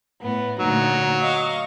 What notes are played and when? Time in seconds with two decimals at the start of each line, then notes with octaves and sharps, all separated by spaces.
0.20 A2 B3
0.59 D2 A#2 F#3 D#4
1.21 D#5 F5 C#6